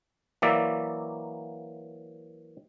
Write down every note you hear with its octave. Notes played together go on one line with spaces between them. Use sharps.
E3 F#3 A#3 D5 E5